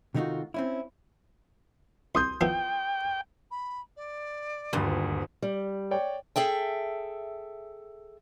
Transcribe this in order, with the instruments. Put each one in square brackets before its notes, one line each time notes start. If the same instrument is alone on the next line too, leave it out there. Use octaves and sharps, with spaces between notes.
[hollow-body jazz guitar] C3 D#3 A3 D#4 F4 F#4
C4 C#4 E4
[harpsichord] C2 [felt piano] C6 D#6 G6
[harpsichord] F3 B3 E4 [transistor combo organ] G5
[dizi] B5
D5
[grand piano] D#1 D2 [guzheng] G2 A#2
[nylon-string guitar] G3
[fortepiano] C#5 D5 G5
[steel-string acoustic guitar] G#4 A4 E5 G5